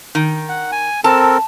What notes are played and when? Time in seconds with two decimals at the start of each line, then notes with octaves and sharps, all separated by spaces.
0.15 D#3
0.49 F#5
0.72 G#5
1.04 C4 A4 A#4 A5